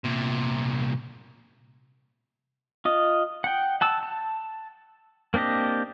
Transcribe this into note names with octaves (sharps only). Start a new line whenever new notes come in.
C2 A#2
F4 D#5
F#5 G5
F#5 A5 E6
A5
A#3 C4 D4 G4 D#5